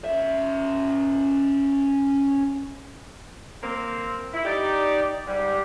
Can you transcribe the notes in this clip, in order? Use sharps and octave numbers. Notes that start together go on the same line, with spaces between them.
C#4 E5
A#3 C4
E4
D#4 G4 D5 D6
G#2 G3 G4